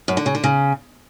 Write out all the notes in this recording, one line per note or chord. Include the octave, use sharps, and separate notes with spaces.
F#2
D3
C#3
D3
C#3